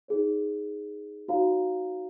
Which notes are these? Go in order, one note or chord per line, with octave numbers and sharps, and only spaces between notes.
D#4 G#4 C#5
D#4 F#4 C#5 F5 A#5